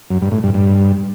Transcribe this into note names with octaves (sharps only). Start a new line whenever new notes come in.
F#2
G2
A2
G2
G2